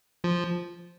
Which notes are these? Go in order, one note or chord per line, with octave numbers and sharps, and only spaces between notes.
F3